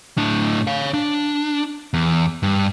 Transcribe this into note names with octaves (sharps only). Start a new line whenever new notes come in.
A2 D4
C#5 F5
D4
E2
G2